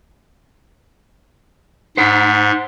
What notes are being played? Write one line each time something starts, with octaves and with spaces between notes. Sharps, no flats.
G#2 C5 F#5